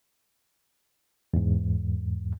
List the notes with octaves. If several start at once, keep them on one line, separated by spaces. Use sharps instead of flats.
E2 G#2